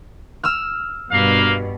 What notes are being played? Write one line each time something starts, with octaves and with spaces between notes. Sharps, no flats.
E6 F6
G2 B2 A#3 B4 F5